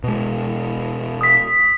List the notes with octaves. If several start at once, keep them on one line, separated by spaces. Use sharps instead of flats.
B2 G#3
D#6 B6